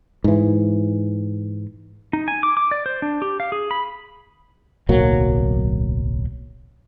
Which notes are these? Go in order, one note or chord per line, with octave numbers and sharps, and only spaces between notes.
G#2 E3
D#4
G#5
D6
D6
D5
C5
D4
G4
F5
G#4
B5
D1 B1 F#3 A#3